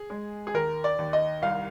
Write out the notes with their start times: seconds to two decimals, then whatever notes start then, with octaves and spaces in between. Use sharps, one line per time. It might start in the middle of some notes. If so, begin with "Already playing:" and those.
Already playing: G#4
0.10 G#3
0.47 G#4
0.54 D#2 A#4
0.84 D5
0.98 D#2
1.13 D#5
1.42 C2 F5